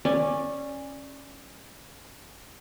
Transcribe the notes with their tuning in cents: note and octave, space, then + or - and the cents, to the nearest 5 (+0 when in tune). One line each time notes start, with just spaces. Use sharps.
C#4 -15 D5 +0